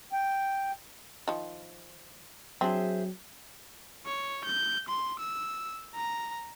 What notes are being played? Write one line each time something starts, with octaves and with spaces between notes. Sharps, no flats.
G5
D#3 F3
F#3 C4 D4 G#4 C5 E5
C#5
G6
C6
E6
A#5